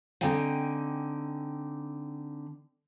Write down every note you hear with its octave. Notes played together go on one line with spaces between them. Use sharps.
D3 C4 D#4 G5 G#5